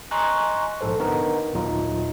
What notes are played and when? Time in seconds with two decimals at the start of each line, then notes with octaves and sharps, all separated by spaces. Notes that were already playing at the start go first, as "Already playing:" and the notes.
0.11 D#5 G#5 A#5 C6 C#6 F#6
0.81 A#1 G#2 A4 C5
0.99 D3 B3 D#4 A#4
1.54 D#2 A#2 F#3 D#4 F4